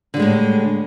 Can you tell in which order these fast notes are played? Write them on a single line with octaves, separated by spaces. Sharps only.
D3 G3 G#3 A2